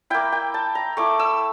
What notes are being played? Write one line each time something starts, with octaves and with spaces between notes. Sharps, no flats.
A#3 E4 G5
G5
A5
A#5
A3 E4 D6
E6